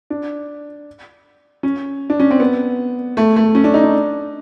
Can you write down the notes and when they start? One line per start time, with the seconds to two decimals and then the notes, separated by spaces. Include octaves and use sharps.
0.10 D4
1.63 C#4
2.10 D4
2.20 C#4
2.31 C4
2.40 B3
3.17 A3
3.36 A3
3.55 C#4
3.64 D4
3.74 D#4
3.83 D4